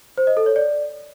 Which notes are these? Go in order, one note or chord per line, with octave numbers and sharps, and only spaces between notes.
C5
D#5
A4
C#5
D5